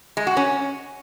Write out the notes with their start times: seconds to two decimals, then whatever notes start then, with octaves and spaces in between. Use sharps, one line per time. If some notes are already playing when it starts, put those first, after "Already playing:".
0.17 G#3
0.27 F#4
0.37 C#4